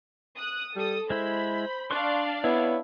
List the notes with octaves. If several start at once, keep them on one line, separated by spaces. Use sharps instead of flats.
D#6 F#6
G3 A4 D#6
G#3 E4 C5 B5
D4 D5 F5 C6 C#6 F#6
B3 E4 C#5